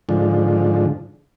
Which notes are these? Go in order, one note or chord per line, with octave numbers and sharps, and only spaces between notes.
G#2 D3 F3